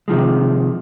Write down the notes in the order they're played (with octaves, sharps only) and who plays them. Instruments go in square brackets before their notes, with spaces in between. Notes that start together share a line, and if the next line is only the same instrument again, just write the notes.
[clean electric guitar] C3 D#3 F3 G#3